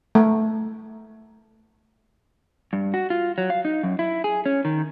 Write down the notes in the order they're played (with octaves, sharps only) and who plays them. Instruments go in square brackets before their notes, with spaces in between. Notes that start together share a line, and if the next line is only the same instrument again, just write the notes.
[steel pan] A3
[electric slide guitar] G2
F#4
F4
F#3
F5
D#4
F#2
E4
G#4
C#4
D#3